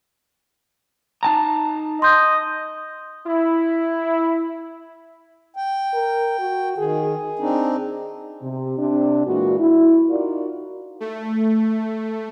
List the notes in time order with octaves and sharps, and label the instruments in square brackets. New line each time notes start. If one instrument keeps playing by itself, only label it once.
[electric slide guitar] D#4 A5 A#5
[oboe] D#5 [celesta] C6 G6
[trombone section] E4
[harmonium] G5
[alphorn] A#4
F#4
[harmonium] D#3 [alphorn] G#4
[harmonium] C4 D4 D#4
[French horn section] C3
C3 D4
A#2 E3 G#3 A#3 F#4
E4
D#4 F4 F#4 A#4 D5
[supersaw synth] A3